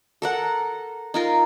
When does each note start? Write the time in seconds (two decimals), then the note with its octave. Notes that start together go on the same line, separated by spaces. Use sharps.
0.22 A4 A#4 F#5
1.14 D#4 F4 A#4